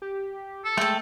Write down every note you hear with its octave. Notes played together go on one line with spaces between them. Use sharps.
G4
A4
G#3 A3 G5 A5